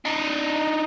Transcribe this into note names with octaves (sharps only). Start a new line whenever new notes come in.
D4 D#4